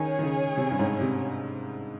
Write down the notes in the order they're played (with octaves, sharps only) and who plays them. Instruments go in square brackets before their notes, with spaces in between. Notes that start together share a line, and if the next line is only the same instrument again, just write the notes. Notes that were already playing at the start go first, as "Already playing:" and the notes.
Already playing: [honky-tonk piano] D#3 [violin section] C#4 G#4 C#5 G#5
[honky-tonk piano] D#3
C#3
C3
G2
G#2
C3